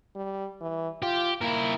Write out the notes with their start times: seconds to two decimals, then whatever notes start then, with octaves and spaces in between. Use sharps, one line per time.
0.15 G3
0.61 E3
1.03 F4 G4
1.41 A#3 E4 A#4